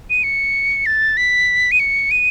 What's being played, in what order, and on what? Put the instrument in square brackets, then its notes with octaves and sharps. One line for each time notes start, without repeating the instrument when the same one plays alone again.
[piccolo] D#7
C#7
A6
B6
D#7
C#7
D#7